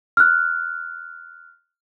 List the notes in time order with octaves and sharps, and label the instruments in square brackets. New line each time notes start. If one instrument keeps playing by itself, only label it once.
[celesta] F6 F#6